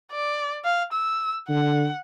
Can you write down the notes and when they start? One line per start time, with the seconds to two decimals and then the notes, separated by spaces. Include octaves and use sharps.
0.12 D5
0.65 F5
0.93 E6
1.49 D3 F#5